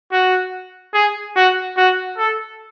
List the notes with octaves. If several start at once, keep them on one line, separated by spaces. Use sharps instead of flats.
F#4
G#4
F#4
F#4
A4